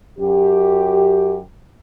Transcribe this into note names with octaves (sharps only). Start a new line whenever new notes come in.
F#2 G4